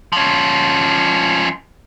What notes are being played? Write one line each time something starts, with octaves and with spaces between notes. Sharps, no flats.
F3 C#4